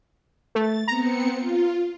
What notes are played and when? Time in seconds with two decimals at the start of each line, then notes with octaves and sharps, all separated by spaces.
0.55 A3 A6
0.88 B3 C4 A#5 C#7
1.33 F4